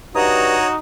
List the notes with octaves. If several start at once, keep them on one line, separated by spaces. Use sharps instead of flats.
G2 D#4 F#4 C#5 A#5 D#6